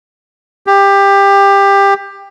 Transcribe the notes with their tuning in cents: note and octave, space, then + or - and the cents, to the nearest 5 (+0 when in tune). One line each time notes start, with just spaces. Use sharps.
G4 +20